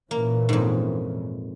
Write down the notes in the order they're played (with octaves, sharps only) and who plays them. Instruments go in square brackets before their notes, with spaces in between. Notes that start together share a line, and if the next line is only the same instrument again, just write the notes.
[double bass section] A#2 E3 C#4 [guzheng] A#3
[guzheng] F2 G#2